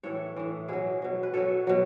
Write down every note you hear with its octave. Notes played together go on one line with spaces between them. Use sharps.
A2 E3 A4 C#5
A2 E3
B2 F#3 E4 G#4
B2 F#3
B4
B2 F#3 A4 C#5
B2 F#3